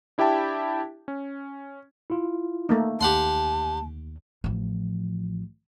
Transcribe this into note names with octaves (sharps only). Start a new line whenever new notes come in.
D4 E4 G4 E5 G5 A5
C#4
E4 F4
A3 A#3 D#4
D#2 G4 F#5 A5 C6
A1 F3